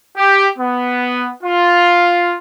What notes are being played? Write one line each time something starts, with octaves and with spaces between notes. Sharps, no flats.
G4
B3
F4